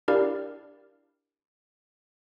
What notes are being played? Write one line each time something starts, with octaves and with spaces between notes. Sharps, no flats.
D4 E4 G4 A#4 D5 F5